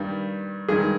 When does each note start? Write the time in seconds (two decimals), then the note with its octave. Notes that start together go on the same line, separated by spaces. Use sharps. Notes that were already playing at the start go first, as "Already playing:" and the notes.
Already playing: G2 D#3 G3
0.68 G2 D#3 G#3 G#4